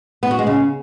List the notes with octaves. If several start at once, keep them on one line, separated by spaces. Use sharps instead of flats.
B3
F#4
G#3
C#3